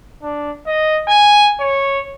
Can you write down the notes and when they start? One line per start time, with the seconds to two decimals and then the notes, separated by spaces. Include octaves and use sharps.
0.23 D4
0.67 D#5
1.08 G#5
1.61 C#5